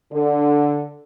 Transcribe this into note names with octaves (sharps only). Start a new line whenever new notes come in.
D3